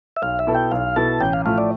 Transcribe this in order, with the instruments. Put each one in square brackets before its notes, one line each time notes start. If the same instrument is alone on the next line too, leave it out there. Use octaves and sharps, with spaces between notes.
[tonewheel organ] E5
[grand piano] B1 [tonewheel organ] F5
[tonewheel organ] E5
[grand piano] B2 B3 E4 A4
[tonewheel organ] G5
[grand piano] B1 [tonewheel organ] F5
[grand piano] B2 B3 E4 A4 [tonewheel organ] A5
[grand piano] A1 [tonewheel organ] G5
[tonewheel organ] F5
[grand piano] A2 F3 A3 [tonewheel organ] F5
[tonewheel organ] D5